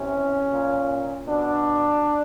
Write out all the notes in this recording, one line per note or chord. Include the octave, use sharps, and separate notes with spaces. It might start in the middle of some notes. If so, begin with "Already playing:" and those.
Already playing: C3 E3 C#4
A#2
B2 D4